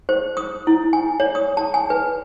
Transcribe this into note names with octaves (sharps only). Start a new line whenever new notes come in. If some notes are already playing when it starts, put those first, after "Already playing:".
C5
D#6
E4
G#5
C#5
D#6
A5
G#5
B4